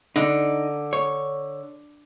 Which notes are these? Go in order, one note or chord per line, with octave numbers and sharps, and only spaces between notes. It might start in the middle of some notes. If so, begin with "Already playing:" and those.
D3 D#4
C#5